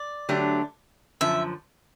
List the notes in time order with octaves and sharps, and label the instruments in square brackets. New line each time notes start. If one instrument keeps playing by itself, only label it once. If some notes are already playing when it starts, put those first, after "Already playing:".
Already playing: [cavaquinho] D5
[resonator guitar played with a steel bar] D3 F#3 A3 D4 G4
[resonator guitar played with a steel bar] F#2 D3 F3 [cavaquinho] E5